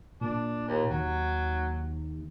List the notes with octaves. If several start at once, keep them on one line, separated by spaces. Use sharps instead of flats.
A#2 D4
D#2
D#2 F#3